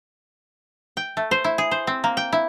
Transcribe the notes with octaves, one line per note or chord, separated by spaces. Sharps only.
G5
A3
C5
E4
G#4
C5
C4
A#3
G5
E4